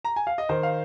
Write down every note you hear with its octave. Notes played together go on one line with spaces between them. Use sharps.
A#5
G#5
F5
D#5
D#3 C5
F5